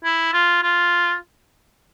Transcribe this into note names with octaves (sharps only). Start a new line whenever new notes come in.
E4
F4
F4